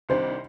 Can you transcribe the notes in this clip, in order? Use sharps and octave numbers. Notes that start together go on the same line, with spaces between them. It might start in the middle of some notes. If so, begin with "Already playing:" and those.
C2 C3 D#3 G3 D4 C5